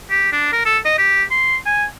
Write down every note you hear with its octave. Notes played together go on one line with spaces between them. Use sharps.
G4
D4
A#4
A4
D#5
G4
C6
G#5